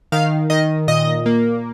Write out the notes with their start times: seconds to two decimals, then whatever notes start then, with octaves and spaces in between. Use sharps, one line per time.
0.12 D#3 F5
0.50 D#3 D#5
0.88 A#2 D#5
1.26 A#3